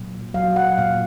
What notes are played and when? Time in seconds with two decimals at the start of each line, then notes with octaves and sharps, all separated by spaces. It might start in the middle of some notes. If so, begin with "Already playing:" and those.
Already playing: A#2 F#3
0.34 F#3 F5
0.56 F#5
0.78 A#2 F5